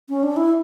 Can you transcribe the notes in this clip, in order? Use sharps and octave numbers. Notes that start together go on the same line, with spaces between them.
C#4
D4
E4